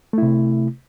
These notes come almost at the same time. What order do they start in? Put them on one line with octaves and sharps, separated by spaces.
A3 E4 C3